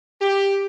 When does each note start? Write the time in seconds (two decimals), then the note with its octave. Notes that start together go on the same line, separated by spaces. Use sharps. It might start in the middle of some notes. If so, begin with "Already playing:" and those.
0.20 G4